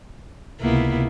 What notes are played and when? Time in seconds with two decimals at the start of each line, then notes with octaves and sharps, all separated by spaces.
0.61 C#2 C3 A#3 B3 E4